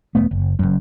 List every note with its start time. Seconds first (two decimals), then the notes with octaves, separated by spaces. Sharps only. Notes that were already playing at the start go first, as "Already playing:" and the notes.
0.15 E1 A3 B3
0.31 F#1
0.59 F#1 F#2